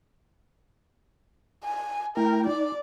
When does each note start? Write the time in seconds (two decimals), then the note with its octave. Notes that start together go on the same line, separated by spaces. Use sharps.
1.64 G#5
2.17 A3 E4 A#4 G5
2.47 D#4 D5